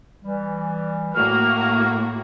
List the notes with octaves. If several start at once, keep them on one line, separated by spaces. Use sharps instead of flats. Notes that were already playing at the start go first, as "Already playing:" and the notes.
E3 G3
A2 A#3 F#4 F6